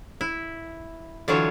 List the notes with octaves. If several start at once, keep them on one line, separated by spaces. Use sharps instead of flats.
E4
D3 E3 F#3 F4 C#5